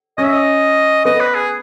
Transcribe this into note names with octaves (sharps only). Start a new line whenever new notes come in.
C#4 D#5
E5
D#5
B3 D#5
B4
G#4